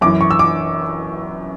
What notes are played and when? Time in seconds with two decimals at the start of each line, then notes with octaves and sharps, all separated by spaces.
0.01 F#2 D6
0.06 E3
0.21 C#6
0.31 E6
0.39 D6